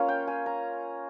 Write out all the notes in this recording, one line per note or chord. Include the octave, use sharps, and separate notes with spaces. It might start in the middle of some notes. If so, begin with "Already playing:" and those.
Already playing: A#3 C#4 F4
G5
G#5
A#5